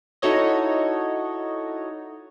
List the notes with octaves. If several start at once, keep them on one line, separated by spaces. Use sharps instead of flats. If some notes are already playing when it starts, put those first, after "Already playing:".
D#4 E4 F#4 A4 C#5 D#5